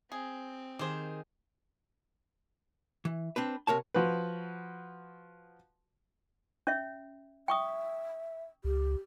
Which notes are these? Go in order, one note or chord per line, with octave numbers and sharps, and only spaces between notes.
C4 G#4
D#3 G4 G#4 C5
E3
C4 D4 B4
C3 A#4 C#5 A5
F3 F#4 B4
C#4 C#5 E5
E5 G5 C#6 D#6
C#2 G4